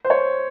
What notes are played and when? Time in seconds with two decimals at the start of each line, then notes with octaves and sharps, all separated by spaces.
0.05 C5
0.10 C#5